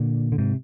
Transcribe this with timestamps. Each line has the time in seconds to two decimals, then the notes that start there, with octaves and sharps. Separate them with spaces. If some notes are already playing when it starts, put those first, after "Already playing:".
Already playing: A#2 D3
0.32 D3
0.38 G#2 C3